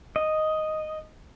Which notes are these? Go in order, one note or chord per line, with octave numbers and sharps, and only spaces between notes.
D#5